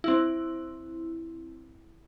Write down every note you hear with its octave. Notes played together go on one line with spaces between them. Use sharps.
C4 E4